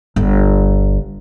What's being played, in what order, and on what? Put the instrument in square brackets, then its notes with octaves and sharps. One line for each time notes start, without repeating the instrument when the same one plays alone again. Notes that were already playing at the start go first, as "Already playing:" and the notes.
[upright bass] G1